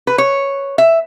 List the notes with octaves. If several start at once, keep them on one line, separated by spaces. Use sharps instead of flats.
B4
C#5
E5